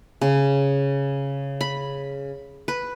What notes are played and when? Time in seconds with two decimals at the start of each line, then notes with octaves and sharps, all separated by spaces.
0.21 C#3
1.61 B5
2.68 B4